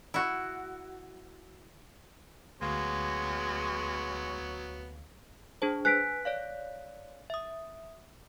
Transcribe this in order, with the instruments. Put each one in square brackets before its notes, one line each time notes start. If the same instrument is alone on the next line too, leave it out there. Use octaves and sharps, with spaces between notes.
[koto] E4 F#4
[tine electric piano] D2 F5 [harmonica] F#3 B3 C#5 [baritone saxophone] G#3
[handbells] D4 G#4 C5 [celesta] A5
[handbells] B4 G#5 [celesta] F#6 B6 D7
[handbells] C#5 D5 F5
E5 D#6